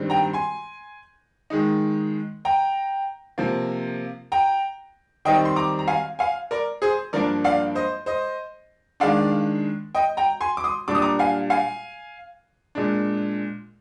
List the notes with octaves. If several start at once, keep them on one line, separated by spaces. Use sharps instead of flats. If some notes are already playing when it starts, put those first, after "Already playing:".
Already playing: G2 D#3 G3 C4
G5 A#5
G#5 C6
D#3 G#3 D#4
G5 A#5
C3 F3 A#3
G5 A#5
D#3 G3 C4 D#4 D#5 G5
C6
A#5 D6
A#5
F5 G#5
F5 G#5
A#4 D5
G#4 C5
G2 F3 A#3 D4 A#4 D5
D5 F5
C5 D#5
C5 D#5
D#3 G#3 D4 D5 F5
D#5 G5
G5 A#5
G#5 C6
D6
C6 D#6
A#2 G3 D4 D6
D#6
A#5 D6
F5 G#5
F5 G#5
A#2 G#3 D4